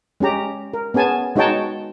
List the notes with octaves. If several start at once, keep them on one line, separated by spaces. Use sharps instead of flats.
G#3 C#4 G4 A#5
A#4
B3 C#4 G#4 G#5 A5
G#3 D#4 F#4 C#5 G5 A5